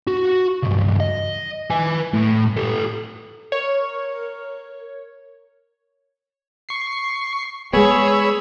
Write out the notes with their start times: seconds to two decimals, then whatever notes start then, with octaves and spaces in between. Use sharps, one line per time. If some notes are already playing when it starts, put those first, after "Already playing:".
0.07 F#4
0.63 C#2 G2
1.00 D#5
1.70 B4 G#5
2.13 A2
2.56 G4 A4
3.52 A#4 C#5
6.69 C#6 C7
7.73 G#3 B3 G#4 C#5 B5 E6